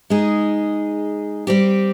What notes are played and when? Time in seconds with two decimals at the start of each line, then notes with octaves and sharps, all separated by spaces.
0.10 G#3 D#4 G#4
1.47 G3 C4 G4